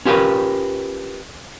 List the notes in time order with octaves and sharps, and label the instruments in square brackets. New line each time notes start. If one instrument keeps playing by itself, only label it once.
[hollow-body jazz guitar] C#4 F4 G4 A#4 B4